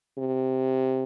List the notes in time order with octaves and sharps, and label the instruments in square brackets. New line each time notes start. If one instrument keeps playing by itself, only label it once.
[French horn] C3